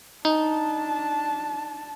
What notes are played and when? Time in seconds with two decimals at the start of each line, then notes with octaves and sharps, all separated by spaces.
0.25 D4 D#4 A5